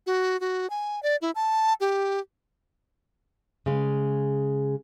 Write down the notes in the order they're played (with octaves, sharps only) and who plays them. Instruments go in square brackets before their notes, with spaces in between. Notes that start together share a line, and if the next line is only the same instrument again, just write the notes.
[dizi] F#4
F#4
G#5
D5
E4
A5
G4
[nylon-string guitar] C#3 G#3